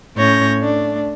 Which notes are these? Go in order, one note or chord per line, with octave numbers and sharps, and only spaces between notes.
A2 C#4 C#5 G6 A#6
A3 D4